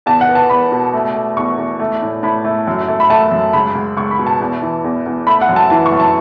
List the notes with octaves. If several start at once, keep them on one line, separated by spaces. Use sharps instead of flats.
E2 A5
F#5
B3
A5
E2 B5
B2
A3
A3
E2 C#6
E2
A3
A2
A2 B5
A3
F#2
A3
B5
A3 A5
F#2
C#2 B5
C#2
C#2 C#6
B5
B2
A5
E2
E3
E2
E2
A3 B5
F#5
F#2
A5
E3 A5
C#6
F#2
A5